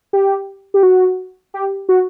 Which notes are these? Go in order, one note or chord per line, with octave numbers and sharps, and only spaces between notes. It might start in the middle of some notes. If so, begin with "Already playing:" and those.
G4
G4
F#4
G4
F#4